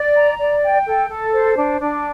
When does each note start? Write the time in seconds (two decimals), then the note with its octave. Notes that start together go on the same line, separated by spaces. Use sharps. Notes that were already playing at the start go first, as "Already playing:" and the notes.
Already playing: D5
0.16 A#5
0.39 D5
0.64 G5
0.87 A4
1.10 A4
1.33 C5
1.56 D4
1.81 D4